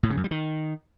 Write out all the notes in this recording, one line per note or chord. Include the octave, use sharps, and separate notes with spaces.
A2
C#3
F#2
G3
D#3